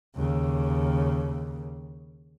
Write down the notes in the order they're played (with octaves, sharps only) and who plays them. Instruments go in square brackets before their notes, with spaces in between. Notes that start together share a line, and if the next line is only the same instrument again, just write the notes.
[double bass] D#2 C#3